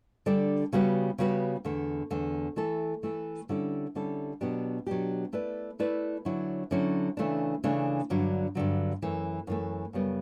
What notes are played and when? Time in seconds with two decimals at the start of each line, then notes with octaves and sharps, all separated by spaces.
0.26 D3 G3 D4 A4 D5
0.73 C#3 G3 B3 F#4 B4
1.18 C#3 G3 B3 F#4 B4
1.65 E2 D3 A3
2.11 E2 D3 A3
2.56 E3 A3 E4 A4
3.03 E3 A3 E4 A4
3.49 D3 G3 C#4 E4 A4
3.95 D3 G3 C#4 E4 A4
4.41 B2 F#3 B3 D4 G4
4.87 B2 F#3 B3 D4 G4
5.33 A3 E4 B4 D5
5.79 A3 E4 B4 D5
6.25 D3 F#3 C#4 E4
6.71 D3 F#3 C#4 E4
7.17 C#3 E3 A3 D4
7.64 C#3 E3 A3 D4
8.10 G2 D3 F#3
8.55 G2 D3 F#3
9.02 F#2 E3 A3
9.47 F#2 E3 A3
9.93 F#2 C#3 G3 B3